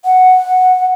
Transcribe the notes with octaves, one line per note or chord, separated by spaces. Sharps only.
F#5